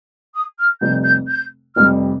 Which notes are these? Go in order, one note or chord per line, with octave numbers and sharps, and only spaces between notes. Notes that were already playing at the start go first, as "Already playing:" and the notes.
D#6
F6
F1 F2 C3 G3 G6
G6
G6
F1 F2 C3 G3 F6